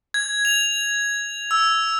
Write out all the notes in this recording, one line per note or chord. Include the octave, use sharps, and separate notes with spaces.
G#6
F7
E6